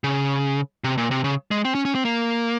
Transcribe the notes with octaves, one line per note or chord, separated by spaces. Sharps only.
C#3
C3
A#2
C3
C#3
G#3
C4
C#4
C#4
C4
A#3